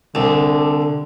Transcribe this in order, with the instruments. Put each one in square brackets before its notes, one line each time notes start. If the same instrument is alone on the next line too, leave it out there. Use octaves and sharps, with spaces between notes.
[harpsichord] C2 [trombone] D3